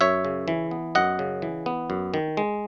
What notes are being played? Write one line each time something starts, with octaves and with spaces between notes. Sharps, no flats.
F#2 C#5 E5
C#3
E3
B3
F#2 D#5 F#5
C#3
E3
B3
F#2
D#3
G#3